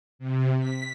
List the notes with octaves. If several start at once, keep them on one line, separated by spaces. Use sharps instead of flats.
C3
B6